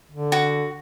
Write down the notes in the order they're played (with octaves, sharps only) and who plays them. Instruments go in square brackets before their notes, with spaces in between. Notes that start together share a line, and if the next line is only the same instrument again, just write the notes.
[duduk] D3
[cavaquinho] F#4